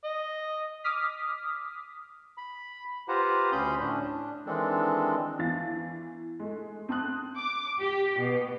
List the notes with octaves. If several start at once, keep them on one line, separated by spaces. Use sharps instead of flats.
D#5
D6 D#6 F6 B6
B5
F4 G4 B4 C5 F#5 A#5
D2 C#4 B5 C6 D#6 G6
A2 C#4 D4
D4
D#3 E3 G#3 C4 D4 A4
E2 E3 F5 A6
G#3 A3
C4 A5 D#6 F#6
D6
G4
B2